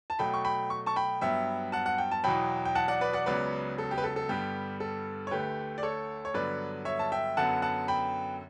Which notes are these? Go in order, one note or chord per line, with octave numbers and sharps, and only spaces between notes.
A5
B2 F#3 A3 G5 B5
C#6
G5 B5
C#6
A5 C#6
G5 B5
G2 F#3 B3 E5 G5
F#5 A5
F#5
G5
A5
E2 B2 F#3 G5 B5
G5
F#5 A5
D5 F#5
B4 D5
D5 F#5
C#2 C#3 F#3 B3 B4 D5
A4
G4
B4
A4
A4
G2 D3 G3 B3 G4
A4
C#5
D2 D3 A3 G4 B4
D5
A4 C#5
C#5
G2 D3 F#3 B3 B4 D5
C#5 E5
A5
E5 G5
F#2 D3 F#3 B3 F#5 A5
F#5 A5
G5 B5